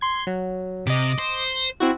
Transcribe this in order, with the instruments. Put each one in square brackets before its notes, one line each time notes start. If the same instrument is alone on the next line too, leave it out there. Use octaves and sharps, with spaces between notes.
[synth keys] C6 G#6
F#3
[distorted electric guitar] C3 [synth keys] D#5 D6
[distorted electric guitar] C5
[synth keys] C4 E4 F#4